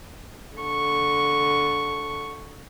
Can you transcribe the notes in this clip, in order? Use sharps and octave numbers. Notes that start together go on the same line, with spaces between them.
D3 C#6